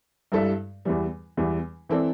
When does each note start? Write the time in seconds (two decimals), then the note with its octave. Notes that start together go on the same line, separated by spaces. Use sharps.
0.32 G2 G3 E4 A4 E5
0.85 E2 E3 G3
1.37 E2 E3 G3
1.89 E3 C4 E4 A4 D5